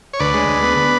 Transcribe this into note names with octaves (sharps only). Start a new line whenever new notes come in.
C#5
D2 B4 D5
G#3
D2
B3
B3